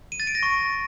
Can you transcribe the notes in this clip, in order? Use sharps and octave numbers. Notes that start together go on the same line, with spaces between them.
D#7
A6
D7
A#6
C#6